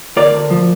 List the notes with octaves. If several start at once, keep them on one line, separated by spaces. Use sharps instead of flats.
D2 A#4 D5
D2
F3